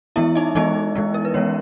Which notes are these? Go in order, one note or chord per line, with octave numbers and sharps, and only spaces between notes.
E3 G#3 B3 E4 E5
D#4 D#5
E3 G#3 B3 D#4 D#5
E3 G#3 B3
A#4
B4
E3 G#3 B3 C#4 C#5